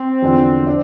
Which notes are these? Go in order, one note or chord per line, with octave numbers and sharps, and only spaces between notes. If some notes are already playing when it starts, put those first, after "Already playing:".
Already playing: C4
E2 D3 F3
D4